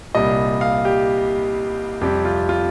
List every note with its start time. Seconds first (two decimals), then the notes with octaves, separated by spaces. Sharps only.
0.15 C2 A#2 G3 D#5
0.61 F5
0.85 G4
2.01 F2 C3 G3 G4
2.25 F4
2.49 F4